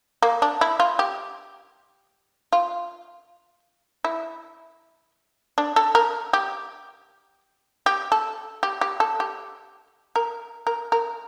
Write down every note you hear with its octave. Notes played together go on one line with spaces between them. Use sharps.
A#3
D4
E4
F4
G4
F4
E4
D4
A4
A#4
G4
G4
A4
G4
G4
A4
G4
A#4
A#4
A#4